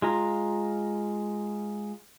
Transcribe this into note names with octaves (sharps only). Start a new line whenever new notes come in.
G#3 F4 A#5